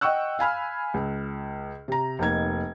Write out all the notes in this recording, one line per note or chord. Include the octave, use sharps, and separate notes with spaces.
D#5 F#5 G5 C#6 E6 F#6
F5 G#5 B5 F6
C#2
C3 A#5
F1 A#3 D#4 G#6